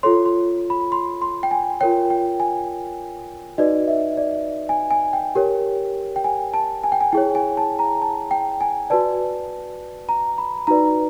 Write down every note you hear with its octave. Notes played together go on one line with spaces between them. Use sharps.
F4 A4 C#5 C6
C6
B5
C6
C6
G5
G#5
F4 A#4 C#5 G5
G5
G#5
D#4 F#4 B4 D5 D#5
E5
D5
G#5
G#5
G5
G4 A#4 C#5
G5
G#5
A5
G#5
G5
G#5
E4 G#4 C#5 G5
G#5
A5
A#5
A5
G5
G#5
F#4 B4 D5 A5
A#5
B5
D#4 F#4 B4 D5 A#5